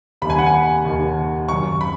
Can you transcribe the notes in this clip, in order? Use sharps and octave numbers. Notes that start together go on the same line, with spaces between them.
D#2 D#3 G#5 B5
F#5
G#5
D#2 D#3
F#2 D#3 C#6
B5